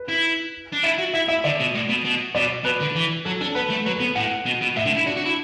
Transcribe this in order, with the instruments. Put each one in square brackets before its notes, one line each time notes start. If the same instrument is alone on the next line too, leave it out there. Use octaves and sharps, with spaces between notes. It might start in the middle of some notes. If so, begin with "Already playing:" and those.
Already playing: [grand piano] B4
[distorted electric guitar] E4
D4
[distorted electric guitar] E4 [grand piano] E5
[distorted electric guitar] F#4
[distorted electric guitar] E4 [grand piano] E5
[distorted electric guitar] E4 [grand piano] E5
[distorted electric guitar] D3 [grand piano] D5
[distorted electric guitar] B2
A2
B2
B2
[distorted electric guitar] B2 [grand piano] D5
[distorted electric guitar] B2 [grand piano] B4
[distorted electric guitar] D3
E3
[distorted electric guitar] F#3 [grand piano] A4
[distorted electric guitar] D4 [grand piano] A4
[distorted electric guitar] B3 [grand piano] B4
[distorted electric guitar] A3
[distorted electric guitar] F#3 [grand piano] B4
[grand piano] A4
[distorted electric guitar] B3
[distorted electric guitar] A2 [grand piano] F#5
[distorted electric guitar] B2
B2
[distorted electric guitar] A2 [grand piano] E5
[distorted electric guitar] D3
E4
[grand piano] D4 [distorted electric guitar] F#4
[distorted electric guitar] F#4
E4